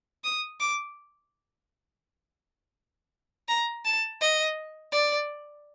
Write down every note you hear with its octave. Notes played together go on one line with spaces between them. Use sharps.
D#6
D6
A#5
A5
D#5
D5